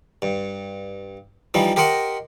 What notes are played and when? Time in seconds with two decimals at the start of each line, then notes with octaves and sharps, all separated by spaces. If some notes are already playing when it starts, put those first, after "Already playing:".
0.22 G2
1.54 E3 F3 G3 D#4
1.76 G4 A#4 C5 D#5 F#5